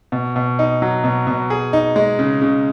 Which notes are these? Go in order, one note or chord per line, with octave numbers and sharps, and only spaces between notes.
B2
B2
D#4
F#3
B2
B2
G#4
D#4
G#3
C#3
C#3